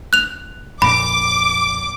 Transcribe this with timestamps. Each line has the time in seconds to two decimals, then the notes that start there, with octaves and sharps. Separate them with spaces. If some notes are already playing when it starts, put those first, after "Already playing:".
0.13 F#6 F7
0.82 F2 A#2 B5 D6